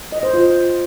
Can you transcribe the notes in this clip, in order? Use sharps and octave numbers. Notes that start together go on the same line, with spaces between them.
D#5
C5
F4